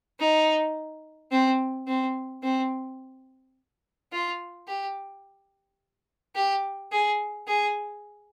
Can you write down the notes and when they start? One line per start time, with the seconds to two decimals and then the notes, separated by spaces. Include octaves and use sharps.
0.20 D#4
1.32 C4
1.87 C4
2.43 C4
4.12 F4
4.68 G4
6.36 G4
6.92 G#4
7.48 G#4